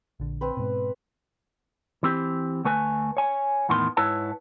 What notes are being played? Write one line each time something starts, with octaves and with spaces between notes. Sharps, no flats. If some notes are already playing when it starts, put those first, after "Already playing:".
A#1 D3
C4 B4
G#2 B2
E3 C4 G4
D2 A3 B4 G#5
C#5 G#5
E2 A2 D#3 B3 C6
G#2 E4 B4 C#5 A5